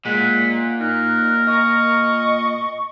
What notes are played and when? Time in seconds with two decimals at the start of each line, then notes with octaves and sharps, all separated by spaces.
0.05 A#2 G#3 F#5 B6
0.81 D#4 A#4 F#6
1.47 D#5 C#6